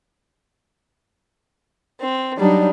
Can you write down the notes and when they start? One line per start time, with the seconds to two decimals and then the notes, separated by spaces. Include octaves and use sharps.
2.00 C4
2.37 F#3 G3 D4 D#4